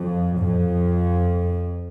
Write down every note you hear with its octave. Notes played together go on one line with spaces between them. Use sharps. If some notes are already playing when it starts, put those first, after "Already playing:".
Already playing: F2
F2